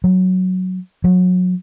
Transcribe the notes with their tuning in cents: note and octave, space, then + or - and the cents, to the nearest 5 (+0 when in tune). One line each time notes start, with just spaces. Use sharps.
F#3 +0
F#3 -30